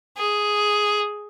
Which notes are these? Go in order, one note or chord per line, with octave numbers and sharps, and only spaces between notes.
G#4